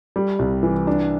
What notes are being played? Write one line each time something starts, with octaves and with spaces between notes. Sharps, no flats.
G3
C2
E3
D4